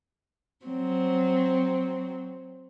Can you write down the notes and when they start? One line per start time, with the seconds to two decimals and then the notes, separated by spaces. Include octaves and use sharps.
0.65 F#3 C4